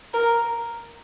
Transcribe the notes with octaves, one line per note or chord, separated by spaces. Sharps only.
A#4